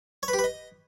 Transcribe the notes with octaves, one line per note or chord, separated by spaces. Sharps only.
C#5
B4
G4
B4
D#5